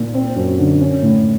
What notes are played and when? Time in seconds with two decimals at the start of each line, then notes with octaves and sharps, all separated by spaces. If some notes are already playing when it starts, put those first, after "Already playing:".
Already playing: A#2
0.14 C4
0.36 F#2
0.59 D3
0.81 C#4
1.03 A2